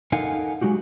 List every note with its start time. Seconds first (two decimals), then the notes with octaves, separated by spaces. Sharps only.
0.12 D#4 A4 A#4 F5 F#5 G#5
0.61 F#3 G#3 D#4 F#4 G4